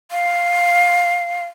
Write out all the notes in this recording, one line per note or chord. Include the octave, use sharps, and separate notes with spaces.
F5